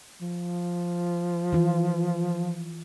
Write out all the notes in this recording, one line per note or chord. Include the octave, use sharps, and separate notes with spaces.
F3
E3 F4